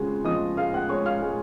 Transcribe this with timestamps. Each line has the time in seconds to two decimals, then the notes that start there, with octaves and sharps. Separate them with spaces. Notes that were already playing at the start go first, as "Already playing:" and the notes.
Already playing: C#3 G#3 C4 F4 F#4
0.25 F3 D#5 D#6
0.57 G#3 F5 F6
0.74 F#5 F#6
0.89 G#3 C#5 C#6
1.06 F5 F6
1.22 G#3